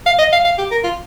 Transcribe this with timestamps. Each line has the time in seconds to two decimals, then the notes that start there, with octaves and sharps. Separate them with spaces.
0.06 F5
0.19 D#5
0.32 F5
0.45 F5
0.58 G4
0.71 A#4
0.84 F4